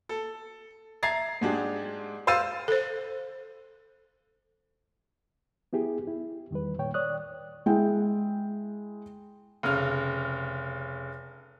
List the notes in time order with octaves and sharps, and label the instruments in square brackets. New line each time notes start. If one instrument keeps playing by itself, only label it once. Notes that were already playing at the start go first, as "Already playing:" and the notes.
[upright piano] A4
E5 A#5 G#6 A6 C7
G#2 G#3 D4 G4
C5 F5 E6 A6 D#7
[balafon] A4 C5
[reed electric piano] B3 E4 G4 G#4
E4
E2 D#3 G3 B4
A#2 D#3 C#5 G5
C#5 D5 D#6 F#6
[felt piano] G#3 E4 G5
[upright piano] F1 C#3 F6